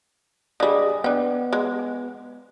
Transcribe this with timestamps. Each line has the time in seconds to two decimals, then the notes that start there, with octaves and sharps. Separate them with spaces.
0.60 D3 G3 G#4 D#5
1.04 B3 D4 G5
1.53 G#3